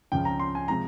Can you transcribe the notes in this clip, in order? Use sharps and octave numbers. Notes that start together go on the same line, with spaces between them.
C#2 C#3 F3 G5
A#5
C6
G#5
C3 F3 G#3 A#5